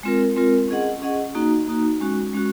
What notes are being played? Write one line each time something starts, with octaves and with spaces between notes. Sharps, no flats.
G#3 C4 F4 A#4
G#3 C4 F4 A#4
C#4 G#4 D#5 F#5
C#4 G#4 D#5 F#5
A#3 D#4 F#4
A#3 D#4 F#4
G#3 C#4 F#4
G#3 C#4 F#4